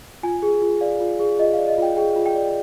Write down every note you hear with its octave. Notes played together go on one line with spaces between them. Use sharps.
F4 G#5
G#4
F4
D5 F5
F4
G#4
F4 D#5
D5 F5
D#5
F4 G5
G#4 G5
F4
G5
D5